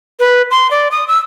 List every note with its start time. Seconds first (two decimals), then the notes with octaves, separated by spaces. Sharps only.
0.20 B4
0.51 C6
0.71 D5
0.91 D#6
1.08 E6